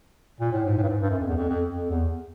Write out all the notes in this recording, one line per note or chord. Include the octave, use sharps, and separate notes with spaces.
A#2
A2
G#2
A2
G2
G#2
G2
F#2
F2
E2
F2
F2
F2
E2